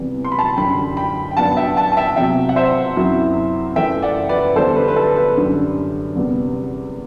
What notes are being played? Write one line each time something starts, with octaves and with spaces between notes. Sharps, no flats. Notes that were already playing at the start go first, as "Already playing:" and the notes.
Already playing: C3 E3 G3 B3
C6
B5
A5 C6
F#2 D3 G3 G5 B5
G5 B5
G5
G2 F#3 B3 D4 F#5 A5
E5 G5
F#5 A5
A5
E5 G5
E2 C3 F#3 E5 G5
F#5
C5 E5
F#2 F#3 C4 E4
F#2 E3 A3 E5 G5
G5
D5 F#5
B4 D5
E2 D3 G3 D4 A4 C5
B4
B4
A4
B4
F#2 D3 G3 D4
E2 C3 G3 B3